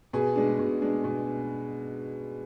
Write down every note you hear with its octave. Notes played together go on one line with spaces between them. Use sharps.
B2 G#4
G#3 D4
B2
G#3 D4
B2